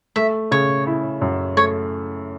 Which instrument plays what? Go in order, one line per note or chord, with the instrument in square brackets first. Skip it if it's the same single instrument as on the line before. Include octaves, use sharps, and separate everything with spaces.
[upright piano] A3 [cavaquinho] E5
[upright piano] C#3 [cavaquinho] C#5
[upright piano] E4
F#2
[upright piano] A3 [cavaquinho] C#5